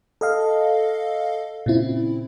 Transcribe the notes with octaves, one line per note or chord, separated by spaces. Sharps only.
A4 D#5 F5
A#2 C#3 C4 E4